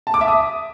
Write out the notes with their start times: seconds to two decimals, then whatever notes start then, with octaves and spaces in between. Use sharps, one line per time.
0.07 A5
0.14 D6
0.21 E5
0.28 D#6